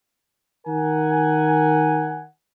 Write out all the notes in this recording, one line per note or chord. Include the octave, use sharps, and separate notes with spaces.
D#3 A#4 F#5 G#5